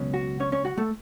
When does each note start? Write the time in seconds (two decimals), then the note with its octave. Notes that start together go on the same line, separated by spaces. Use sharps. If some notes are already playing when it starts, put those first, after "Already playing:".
Already playing: C#2 B2 F#3 C#4
0.14 F#4
0.40 C#4 C#5
0.52 C#4 C#5
0.65 F#4 F#5
0.77 A3 A4